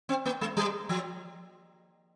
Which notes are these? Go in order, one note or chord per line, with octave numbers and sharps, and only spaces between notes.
C4
A#3
G#3
G3
F3